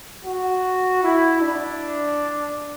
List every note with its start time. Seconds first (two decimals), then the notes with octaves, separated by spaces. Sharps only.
0.25 F#4
1.03 E4
1.41 D4